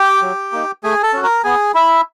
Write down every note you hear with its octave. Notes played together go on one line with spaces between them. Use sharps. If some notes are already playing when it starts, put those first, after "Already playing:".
Already playing: G4 G5
F#3
A#3 D#4
A3 G#4 G#5
A4 A5
C#4 F#4
A#4 A#5
B3 G#4 G#5
E4 E5